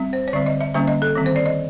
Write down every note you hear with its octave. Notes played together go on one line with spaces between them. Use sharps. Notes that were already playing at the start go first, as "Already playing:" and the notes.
Already playing: G3 C4
C5
C#5
D3 G3 C4 D5
D#5
E5
D3 G3 A#3 C#4 E5
D#5
A4
D#3 G3 C4
C5
D5
D#5